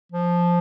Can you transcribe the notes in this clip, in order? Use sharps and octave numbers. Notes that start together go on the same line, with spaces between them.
F3